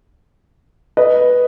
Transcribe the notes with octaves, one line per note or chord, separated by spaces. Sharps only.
B4 D#5